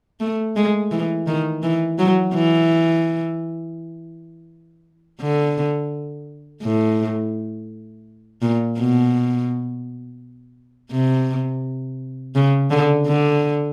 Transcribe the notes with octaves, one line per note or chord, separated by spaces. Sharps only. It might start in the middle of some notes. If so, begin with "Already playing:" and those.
A3
G#3
E3
D#3
E3
F#3
E3
D3
A2
A#2
B2
C3
C#3
D3
D3